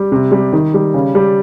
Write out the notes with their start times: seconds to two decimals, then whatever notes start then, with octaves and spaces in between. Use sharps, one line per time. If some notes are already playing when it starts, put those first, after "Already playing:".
Already playing: G3
0.12 C3
0.32 G3
0.53 D#3
0.74 G3
0.94 C#3
1.15 G3